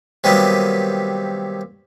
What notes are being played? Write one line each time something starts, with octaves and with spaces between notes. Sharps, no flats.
C3 D#3 F#3 G3 A#3 B3